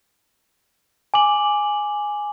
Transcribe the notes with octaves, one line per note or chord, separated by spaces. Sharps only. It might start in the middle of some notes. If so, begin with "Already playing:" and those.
G#5 D6 F#7